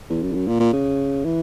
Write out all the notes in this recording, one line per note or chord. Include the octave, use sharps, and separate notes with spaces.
E2
F#2
E2
F#2
A#2
A#2
C#3
E3